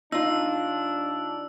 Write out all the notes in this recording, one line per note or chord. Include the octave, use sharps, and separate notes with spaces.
D#2 D4 D#4 F4 E6